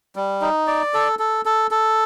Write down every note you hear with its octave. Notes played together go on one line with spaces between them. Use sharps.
G3
D#4
D5
A4
A4
A4
A4